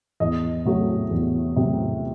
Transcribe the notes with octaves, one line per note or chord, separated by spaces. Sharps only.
E2 D#5
C3 F#3 A3
E2
C3 F#3 A3